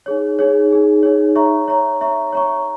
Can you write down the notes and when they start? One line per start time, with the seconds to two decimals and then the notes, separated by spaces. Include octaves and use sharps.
0.06 D#4 G#4 C#5
0.39 D#4 G#4 C#5
0.71 D#4 G#4 C#5
1.03 D#4 G#4 C#5
1.35 C#5 E5 A#5 C#6
1.68 C#5 E5 A#5 C#6
2.01 C#5 E5 A#5 C#6
2.33 C#5 E5 A#5 C#6